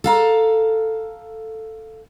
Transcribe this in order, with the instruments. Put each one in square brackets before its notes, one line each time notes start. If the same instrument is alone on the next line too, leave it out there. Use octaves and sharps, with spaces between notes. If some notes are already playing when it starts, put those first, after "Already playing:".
[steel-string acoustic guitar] A4 F5 A#5